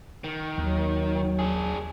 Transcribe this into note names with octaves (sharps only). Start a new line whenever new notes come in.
D#3
D#2 F#3
D4 G#4